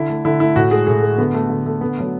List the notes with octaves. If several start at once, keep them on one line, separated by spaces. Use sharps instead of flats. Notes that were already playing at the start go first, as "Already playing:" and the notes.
Already playing: D3 E4
A3
D3 E4
A3 E4
A2 F#4
G#3 G#4
A2 G#4
G#3
D3 B3
A3
D3
A3
D3 B3
F#3 A3